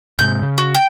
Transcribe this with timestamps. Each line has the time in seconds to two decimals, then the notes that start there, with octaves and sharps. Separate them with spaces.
0.19 G#2 C3 G#3 G6
0.42 C#3
0.58 F#4
0.75 G5